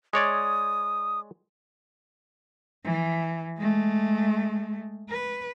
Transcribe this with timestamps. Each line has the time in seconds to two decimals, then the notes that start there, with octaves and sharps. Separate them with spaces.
0.13 G#3 C#5 D5 D#6
2.84 E3
3.58 G#3 A3
5.09 B4